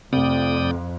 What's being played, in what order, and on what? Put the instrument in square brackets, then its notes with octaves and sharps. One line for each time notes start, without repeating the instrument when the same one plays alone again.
[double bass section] F2 [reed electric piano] C3 A3 [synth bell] C4 [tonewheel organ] D5 G5 D#6